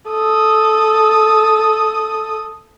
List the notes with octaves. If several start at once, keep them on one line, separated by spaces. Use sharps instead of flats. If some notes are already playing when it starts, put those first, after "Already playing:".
A4 D#6